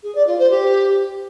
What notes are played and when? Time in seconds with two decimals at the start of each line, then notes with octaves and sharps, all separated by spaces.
0.03 G#4
0.15 D5
0.27 F4
0.39 C5
0.50 G4